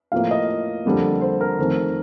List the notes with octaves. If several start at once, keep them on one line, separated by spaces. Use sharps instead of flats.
A2 F3 A#3 F5
D#5
F2 D3 G3 A#3
C5
A#4
F2 D#3 A3 C4